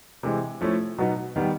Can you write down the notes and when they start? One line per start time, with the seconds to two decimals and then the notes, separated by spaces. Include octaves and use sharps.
0.23 C3 E3 G#3
0.61 F3 A3 C#4 E4
0.98 B2 F#3 B3 D#4
1.36 D#3 G3 B3